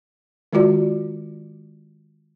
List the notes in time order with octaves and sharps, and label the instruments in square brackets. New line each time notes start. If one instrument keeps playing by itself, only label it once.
[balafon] D#3 G#3 F4 F#4 D5